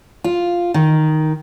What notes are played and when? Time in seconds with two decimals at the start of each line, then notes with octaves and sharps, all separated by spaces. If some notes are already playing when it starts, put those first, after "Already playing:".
0.24 F4
0.74 D#3